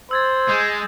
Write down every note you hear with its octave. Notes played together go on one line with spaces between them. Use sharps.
C5 E6 G#6 A6
G#3 D#6 G6 E7